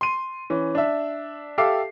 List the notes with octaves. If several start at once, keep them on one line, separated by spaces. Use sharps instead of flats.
C6 D#7
E3 C#4
D4 E5
G4 A4 E5 F5 D6 C7